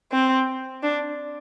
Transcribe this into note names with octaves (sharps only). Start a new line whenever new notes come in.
C4
D4